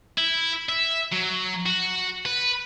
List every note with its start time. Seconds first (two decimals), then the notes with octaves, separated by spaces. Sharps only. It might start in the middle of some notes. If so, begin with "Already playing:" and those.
0.18 E4
0.69 E5
1.12 F#3
1.66 F#4
2.25 B4